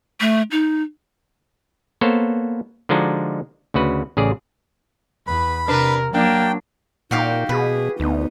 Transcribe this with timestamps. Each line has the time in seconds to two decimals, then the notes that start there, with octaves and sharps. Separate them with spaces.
0.21 A3
0.51 D#4
2.01 A#3 B3 A4 C5 C#5 A5
2.89 D3 F3 G#3 D4 D#4 F#4
3.74 D2 C#3 F#4 B4
4.17 A1 C#3 G#4 D5
5.27 E2 B4 B5
5.68 C3 D4 A#4 B4
6.14 F#3 A#3 D4 G5
7.11 A#2 D#4 F#4 G4 F5 G5
7.49 B2 G#4 B4
8.00 D2 B3 D#4